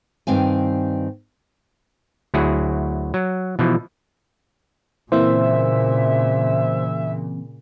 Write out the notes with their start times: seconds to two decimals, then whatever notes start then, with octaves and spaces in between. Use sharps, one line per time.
0.27 G2 D#3 C4 F5 G#5
2.34 D2 F#3 E4 F#4 G#4
3.14 F#3
3.59 B2 E3 F3
5.12 A#2 C#3 E3 A#3 C4 C5 E5